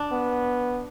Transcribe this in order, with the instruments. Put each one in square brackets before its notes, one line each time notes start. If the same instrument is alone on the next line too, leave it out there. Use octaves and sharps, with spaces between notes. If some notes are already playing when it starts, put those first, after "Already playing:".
Already playing: [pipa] D4
[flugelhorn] B3